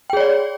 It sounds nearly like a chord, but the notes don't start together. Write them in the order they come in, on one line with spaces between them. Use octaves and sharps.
G5 G#4 C#5 D5